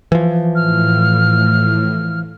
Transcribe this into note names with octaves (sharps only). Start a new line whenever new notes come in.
E3 F3
A2 F6